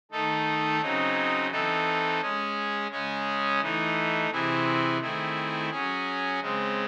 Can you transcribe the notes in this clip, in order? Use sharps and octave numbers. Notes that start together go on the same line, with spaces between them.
D#3 A3 D#4 A4
C#3 F#3 C4 D#4
E3 C4 D#4 A4
G#3 C#4 G#4
C#3 G#3 C#4 G#4
E3 A3 D#4
C3 E3 C4 E4 G#4
D#3 A3 C4 E4 G#4
F#3 C#4 G#4
C#3 G#3 C4